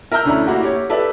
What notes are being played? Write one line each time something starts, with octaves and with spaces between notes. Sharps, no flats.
A#4 E5 A#5 E6 F6 G6
D2 C#4 D4 E4 A#5
A#3 E4 F#4 G4
G4 C#5
G4 A4 B4 D5 E5